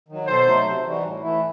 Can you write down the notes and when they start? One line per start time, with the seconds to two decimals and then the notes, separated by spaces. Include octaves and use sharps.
0.08 D#3 F#3
0.27 B2 A4 C5
0.46 F#3 A3 D#4
0.66 C3
0.84 E3 G3 D#4 F#4
1.03 A2
1.22 E3 A3 E4